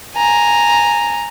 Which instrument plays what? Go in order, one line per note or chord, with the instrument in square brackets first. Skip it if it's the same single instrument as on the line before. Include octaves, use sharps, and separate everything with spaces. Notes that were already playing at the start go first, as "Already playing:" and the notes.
[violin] G#5 A#5